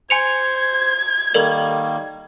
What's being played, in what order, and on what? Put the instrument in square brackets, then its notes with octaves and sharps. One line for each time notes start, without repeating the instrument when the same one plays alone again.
[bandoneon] C5 [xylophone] G#5 C#7 F7 [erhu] G#6
[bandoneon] D#3 G3 A#3 [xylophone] A4 A#4 D5